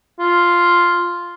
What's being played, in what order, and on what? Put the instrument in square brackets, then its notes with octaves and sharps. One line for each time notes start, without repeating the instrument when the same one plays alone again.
[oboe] F4